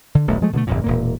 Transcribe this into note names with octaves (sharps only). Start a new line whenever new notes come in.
D3
D#1 B1 A3
F3 G#3 A3
B2 D3 G#3 A3
G1 F2 A#2
E1 A#2 A#3